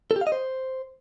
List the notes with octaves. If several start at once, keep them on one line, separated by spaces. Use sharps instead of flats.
A4
G4
F5
D#5
C5